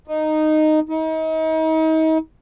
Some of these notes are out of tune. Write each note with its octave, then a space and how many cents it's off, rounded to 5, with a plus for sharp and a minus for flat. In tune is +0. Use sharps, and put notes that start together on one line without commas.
D#4 -10
D#4 +35